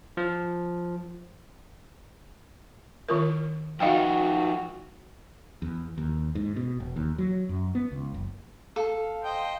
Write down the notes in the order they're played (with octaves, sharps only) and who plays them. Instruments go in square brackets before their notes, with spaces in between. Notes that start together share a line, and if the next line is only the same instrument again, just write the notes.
[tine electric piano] F3
[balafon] D#3 F4 A#4
[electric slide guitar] F3 D#4 [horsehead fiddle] F#4 [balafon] D#5 F5 G5
[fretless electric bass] E2
D#2
G#2
B2
E1
D#2
F#3
F#2
B3
C#2
F#1
[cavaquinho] A4 [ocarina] F5
[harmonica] C5 D#5 G5